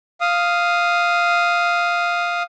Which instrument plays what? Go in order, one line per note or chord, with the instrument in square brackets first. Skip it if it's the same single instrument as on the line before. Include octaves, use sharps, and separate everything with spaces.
[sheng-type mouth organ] F5 D#6